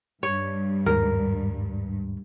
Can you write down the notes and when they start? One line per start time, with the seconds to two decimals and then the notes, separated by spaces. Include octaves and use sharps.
0.23 G2 C#5
0.86 D#2 G#2 A#4